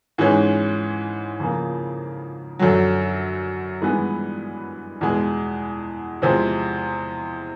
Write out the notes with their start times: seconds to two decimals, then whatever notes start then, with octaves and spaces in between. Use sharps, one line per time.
0.18 G#2 E3 G#3 C#4
1.39 F2 C#3 F3 A#3
2.59 F#2 D3 F#3
3.81 G2 E3 G#3 B3
5.01 E2 B2 G#3
6.22 E2 C3 F3 G#3 C4